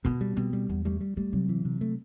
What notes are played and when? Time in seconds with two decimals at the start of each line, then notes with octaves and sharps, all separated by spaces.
0.05 B2 B3
0.21 G3
0.36 B2 C4
0.53 G3
0.69 E2 B3
0.85 G3 A3
1.01 G3
1.17 G3 A3
1.33 C3 F#3
1.49 E3
1.65 C3
1.81 A3